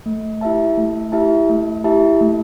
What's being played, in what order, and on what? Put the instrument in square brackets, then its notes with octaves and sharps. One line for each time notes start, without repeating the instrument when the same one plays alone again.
[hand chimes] A3
E4 G4 E5 A5
A3
E4 G4 E5 A5
A3
E4 G4 E5 A5
A3